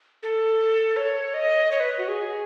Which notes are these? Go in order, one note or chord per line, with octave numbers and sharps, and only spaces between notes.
A4
C#5
D#5
C#5
B4
F#4
G#4